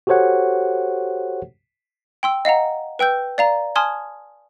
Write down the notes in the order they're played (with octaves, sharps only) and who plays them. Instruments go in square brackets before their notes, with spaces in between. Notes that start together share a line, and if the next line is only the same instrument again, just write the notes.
[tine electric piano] F#4 G4 A4 C5 C#5 F#5
[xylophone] G5 C6 E6
D#5 F5 F#5 A#5
B4 G5 E6 G6
D5 F5 A#5
G#5 A5 C6 D#6 F6 G#6